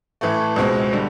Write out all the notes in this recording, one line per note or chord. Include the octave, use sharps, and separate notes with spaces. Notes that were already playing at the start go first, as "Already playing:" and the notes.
A2 E3 A3
C#2 B2 G#3 C4
D3 G3